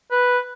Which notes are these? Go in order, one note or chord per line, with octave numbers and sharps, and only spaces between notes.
B4